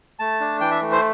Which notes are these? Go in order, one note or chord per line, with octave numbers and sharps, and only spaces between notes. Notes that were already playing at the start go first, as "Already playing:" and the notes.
A3 A5
D4
E3 G5
E5
A3
C5